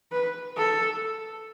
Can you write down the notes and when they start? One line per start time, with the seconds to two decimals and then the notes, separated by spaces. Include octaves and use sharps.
0.12 B4
0.57 A4